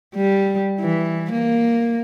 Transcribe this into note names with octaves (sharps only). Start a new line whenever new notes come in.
G3
E3
A#3